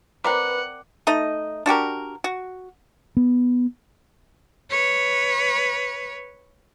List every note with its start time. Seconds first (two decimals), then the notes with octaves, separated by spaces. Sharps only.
0.24 C4 A#4 B4 D5 F#5 D6
1.07 A3 D#4 D#5
1.66 D4 F#4 G4 A#4
2.24 F#4
3.17 B3
4.70 B4 C#5